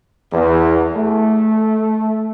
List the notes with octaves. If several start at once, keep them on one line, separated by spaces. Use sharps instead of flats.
E2
A3